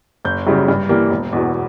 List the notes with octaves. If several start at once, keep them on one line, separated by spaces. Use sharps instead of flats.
F#1 G6
F#2 C#3 G3
G2
E3 G3 A#3
E1
E2 B2